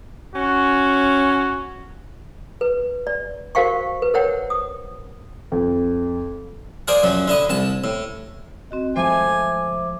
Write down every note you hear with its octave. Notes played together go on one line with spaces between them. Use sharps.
C#4 F#4
B4
D5
F#4 A#4 C5 F5 G5 C#6
B4
A#4 C5 C#5 F#5 G5
D#6
F2
F4 G#4 A#4 C5 D5
F#2 F3 F#3
D3 E4 D#5
C2 A5
A2
C4 F#4 D#5
F3 G#3 A3 C5 E5 G#5 D6